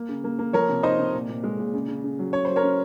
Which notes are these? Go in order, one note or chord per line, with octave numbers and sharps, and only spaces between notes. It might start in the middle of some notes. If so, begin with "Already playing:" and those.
Already playing: A#3
C#3
A#3
A#3
F3 A#4 C#5
C3
D#4 C5 D#5
C3
A#2
A#2
G#3
A#2
C#3
C#3
C#3
F#3
C#3 C#5
F#3 C5
A#4 C#5
C#4